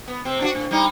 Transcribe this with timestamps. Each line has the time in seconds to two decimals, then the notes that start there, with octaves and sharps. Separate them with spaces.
0.08 B3
0.25 C3 C4
0.41 D4 F4 F#4
0.55 A2
0.71 G3 D#4